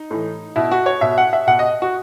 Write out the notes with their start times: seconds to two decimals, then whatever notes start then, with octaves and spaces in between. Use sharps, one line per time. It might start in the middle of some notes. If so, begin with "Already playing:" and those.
Already playing: D#4
0.11 A2 E3
0.56 B2 E4
0.71 F#4
0.86 C#5
1.01 B2 E5
1.18 F#5
1.33 E5
1.47 B2 F#5
1.59 D#5
1.82 F#4